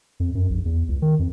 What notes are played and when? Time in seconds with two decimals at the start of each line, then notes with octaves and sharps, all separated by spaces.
0.20 F2
0.35 F#2
0.50 A#1
0.65 E2
0.89 C#2
1.02 D#3
1.19 F2